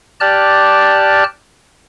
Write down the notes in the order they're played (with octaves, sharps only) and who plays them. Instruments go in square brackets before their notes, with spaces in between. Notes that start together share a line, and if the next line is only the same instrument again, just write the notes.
[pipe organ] G4 D5 A5 F6 F#6